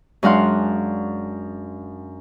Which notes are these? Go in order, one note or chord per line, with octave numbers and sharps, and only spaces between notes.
F#2 G#3 D4 F5 F#5 C6